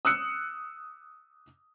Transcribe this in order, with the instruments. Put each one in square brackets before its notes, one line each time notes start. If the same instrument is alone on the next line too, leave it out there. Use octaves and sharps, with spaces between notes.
[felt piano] D#6 E6 F#6 C#7